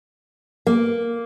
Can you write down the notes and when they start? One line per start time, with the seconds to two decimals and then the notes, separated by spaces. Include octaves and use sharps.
0.67 A#3